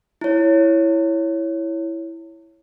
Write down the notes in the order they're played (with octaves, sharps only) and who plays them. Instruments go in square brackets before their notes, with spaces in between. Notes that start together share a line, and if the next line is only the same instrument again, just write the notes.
[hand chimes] E4 C#5